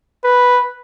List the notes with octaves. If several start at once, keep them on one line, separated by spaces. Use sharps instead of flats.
B4